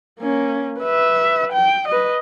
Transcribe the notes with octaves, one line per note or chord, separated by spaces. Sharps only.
A#3 C#4
B4 E5
G5
B4 D#5